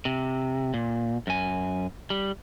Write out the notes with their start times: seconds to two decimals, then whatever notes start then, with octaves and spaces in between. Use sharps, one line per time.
0.05 C3
0.74 A#2
1.27 F#2 G#5
2.10 G3